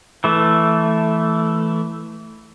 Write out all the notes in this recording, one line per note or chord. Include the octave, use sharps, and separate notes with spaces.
E3 A3